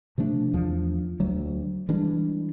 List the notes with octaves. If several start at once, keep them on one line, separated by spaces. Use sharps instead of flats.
C3 F3 A3 D4
E2 F3 D4
D2 F#3
E3 G3 G#3 D4